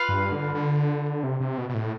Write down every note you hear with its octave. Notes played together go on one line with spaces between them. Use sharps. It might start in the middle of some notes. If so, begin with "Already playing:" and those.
Already playing: F4 B4 F5
G2
D3
D3
C3
C3
B2
B2
A2